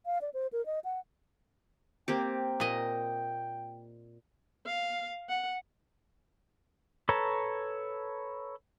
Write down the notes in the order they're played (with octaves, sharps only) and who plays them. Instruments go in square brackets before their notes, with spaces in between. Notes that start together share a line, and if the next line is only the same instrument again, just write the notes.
[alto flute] F5
D5
C5
A#4
D#5
F#5
[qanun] A#3 C4 G4 [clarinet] G5
[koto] A#2 D#5
[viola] F5
F#5
[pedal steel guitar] A4 B4 C#5 A5 A#5